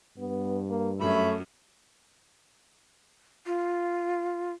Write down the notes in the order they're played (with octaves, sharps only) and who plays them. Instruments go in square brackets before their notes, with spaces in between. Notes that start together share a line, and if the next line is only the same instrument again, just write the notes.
[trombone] G2 [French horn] B3
[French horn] A#3
[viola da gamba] F#2 [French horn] A3 [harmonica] C#5 E5 B5
[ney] F4